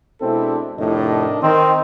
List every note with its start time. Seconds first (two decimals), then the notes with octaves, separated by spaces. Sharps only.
0.21 B2 G#3 C4 D4 E4 A4
0.78 F2 A2 C3 D#3 D4 D#5
1.42 D#3 C4 D#5